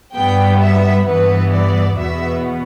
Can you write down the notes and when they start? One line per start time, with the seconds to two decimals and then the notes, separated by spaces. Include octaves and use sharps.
0.15 G2 G3 B3 G5
0.60 E5
1.05 G2 E3 B3 B4
1.51 D5
1.95 E2 B2 B3 E5